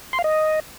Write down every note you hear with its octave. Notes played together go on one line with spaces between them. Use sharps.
C6
F5
D#5